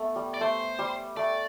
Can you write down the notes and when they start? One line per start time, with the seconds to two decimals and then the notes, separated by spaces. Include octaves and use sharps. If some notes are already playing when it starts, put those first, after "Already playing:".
Already playing: A3 B3
0.16 G3
0.34 D5
0.41 A3 C5
0.79 G3
1.16 A3 D5